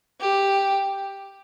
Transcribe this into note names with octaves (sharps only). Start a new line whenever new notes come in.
G4